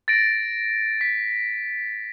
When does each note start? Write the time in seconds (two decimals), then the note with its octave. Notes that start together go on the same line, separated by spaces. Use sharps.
0.08 A6 A#6 D7
1.01 B6